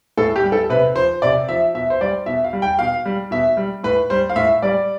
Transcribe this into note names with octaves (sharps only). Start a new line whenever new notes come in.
A2 A4
G4
G3
A4
C3 B4
F3 C5
C3 D5
F3 E5
B2 E5
C5
G3 D5
B2 E5
F5
G3
G5
B2 F5
G3
B2 E5
G3
A2 B4
G3 C5
F5
A2 E5
G3 D5